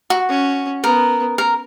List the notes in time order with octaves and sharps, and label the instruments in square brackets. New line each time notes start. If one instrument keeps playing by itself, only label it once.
[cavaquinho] F#4
[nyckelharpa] C#4
[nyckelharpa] B3 [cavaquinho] A#4
[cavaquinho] A#4